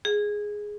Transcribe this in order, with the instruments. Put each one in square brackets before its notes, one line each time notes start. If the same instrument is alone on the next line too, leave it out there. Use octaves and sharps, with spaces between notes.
[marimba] G#4